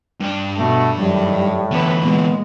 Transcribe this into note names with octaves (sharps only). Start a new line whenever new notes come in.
G2 D4
B2 A3 F#4
F#2 A2 D#3 G3
D3 E3 B3 B4
A#2 G#3 B3